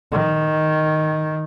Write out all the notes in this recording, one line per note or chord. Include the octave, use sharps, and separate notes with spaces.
D#3